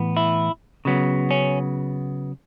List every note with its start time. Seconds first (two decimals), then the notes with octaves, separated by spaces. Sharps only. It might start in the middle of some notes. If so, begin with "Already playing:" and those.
Already playing: A2 E3 B3
0.17 E4
0.85 C#3 F#3 B3
1.31 C#4